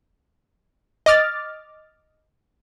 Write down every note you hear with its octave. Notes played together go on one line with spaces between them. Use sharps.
D#5 D6 F6 A6